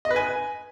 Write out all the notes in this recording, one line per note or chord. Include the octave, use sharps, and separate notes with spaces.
D#5
B4
G#5